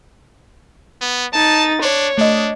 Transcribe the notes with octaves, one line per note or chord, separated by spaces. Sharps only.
B3
D#4 A5 A6
D4 C#5
A3 D4 D#5